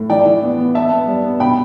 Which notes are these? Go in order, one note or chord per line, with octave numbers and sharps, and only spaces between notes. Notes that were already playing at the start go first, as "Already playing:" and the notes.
Already playing: A2
E3 D5 G5
E3
B3
B3
B3 E5 A5
B3
G3
B3
B2 G5 B5